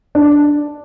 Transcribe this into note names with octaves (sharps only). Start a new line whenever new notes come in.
D4